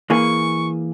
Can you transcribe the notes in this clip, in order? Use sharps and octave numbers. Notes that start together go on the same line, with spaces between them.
E3 A#3 G#4 C#6